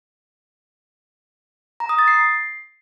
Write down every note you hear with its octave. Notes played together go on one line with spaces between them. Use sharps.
A#5
D#6
A6
C7